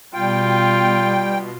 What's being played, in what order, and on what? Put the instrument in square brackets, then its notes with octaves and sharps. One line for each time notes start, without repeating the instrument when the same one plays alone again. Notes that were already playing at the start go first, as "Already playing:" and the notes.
[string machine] B2 [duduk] G3 [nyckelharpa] F4 [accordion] G5